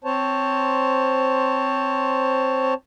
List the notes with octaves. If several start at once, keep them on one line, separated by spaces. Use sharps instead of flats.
C4 C5 C#5 A5